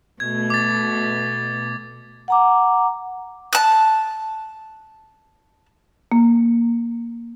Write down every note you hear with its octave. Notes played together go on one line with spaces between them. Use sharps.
B2 A3 G#6
D6 A6
F#5 A#5 D6
A5 F#6
A#3